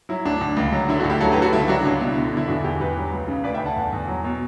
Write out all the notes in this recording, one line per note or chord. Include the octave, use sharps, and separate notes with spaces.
F#3 E4
D2 D4
D2
C#2
F#3
D3 E4
D4 F#4
D2
E4 G4
F#3 F#4 A4
G4 B4
D3
F#4 A4
C#2 E4 G4
F#3 D4 F#4
C#2 D4
B2 E4
D3
D3
E4
E2 D4 F#4
E2 E4 G4
E2 G4 B4
F#3
C#2
C#3
D2 B4 D5
E5 G5
D2
F#5 A5
E2
E2
F#3
B2